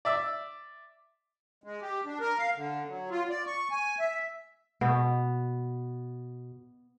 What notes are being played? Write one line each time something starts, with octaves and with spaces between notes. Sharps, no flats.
D5 E5 E6
G#3
G4
D4
A#4
F5
D3
F#3
F4
D5
C#6
G#5
E5
B2 B3